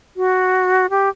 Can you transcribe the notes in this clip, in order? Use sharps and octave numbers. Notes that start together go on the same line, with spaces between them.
F#4
G4